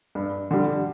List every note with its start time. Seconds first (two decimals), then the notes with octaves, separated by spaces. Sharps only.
0.15 G2
0.51 D3 G3